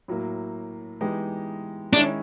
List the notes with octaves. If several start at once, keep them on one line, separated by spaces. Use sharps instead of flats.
A2 F#3 A#3
E3 G#3 B3 D#4 G4
D#3 G#3 C#4 D4 E4